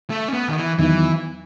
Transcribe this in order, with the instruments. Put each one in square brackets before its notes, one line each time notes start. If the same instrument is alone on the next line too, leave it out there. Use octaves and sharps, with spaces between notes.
[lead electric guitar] A3
C#4
B3
D#3
E3
[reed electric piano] E2 D#3 F#3 B3 D#4 [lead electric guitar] E3